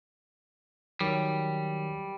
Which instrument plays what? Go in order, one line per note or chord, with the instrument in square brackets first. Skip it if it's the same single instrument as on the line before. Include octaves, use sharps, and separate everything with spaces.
[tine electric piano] D#3 F#3 [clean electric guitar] G3